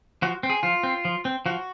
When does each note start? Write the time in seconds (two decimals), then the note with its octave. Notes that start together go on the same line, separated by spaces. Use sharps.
0.22 F3 F#4
0.43 C4
0.50 G#4
0.63 F3 F4
0.83 C4
1.05 F3
1.25 C4
1.46 F3 F#4